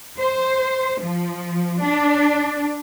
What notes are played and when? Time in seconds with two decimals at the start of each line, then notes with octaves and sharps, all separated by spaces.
0.18 C5
1.01 F3
1.81 D4